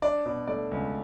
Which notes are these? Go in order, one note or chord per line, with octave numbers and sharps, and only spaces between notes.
D4 D5
B2
A3 D5
C#2